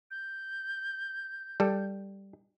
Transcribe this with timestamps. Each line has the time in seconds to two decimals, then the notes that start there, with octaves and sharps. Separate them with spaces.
0.11 G6
1.60 G3 A4